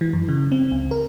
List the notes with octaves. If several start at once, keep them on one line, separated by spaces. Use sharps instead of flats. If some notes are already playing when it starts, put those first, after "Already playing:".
E3
F#2
C#3
C4
C#2
A#4